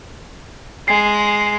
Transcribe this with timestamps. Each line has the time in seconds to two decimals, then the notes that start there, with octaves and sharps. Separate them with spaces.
0.88 G#3 C7